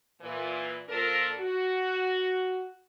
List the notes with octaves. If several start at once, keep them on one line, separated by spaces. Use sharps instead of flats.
A#2 E3
A#2 F3 D4 A4 A#4
F#4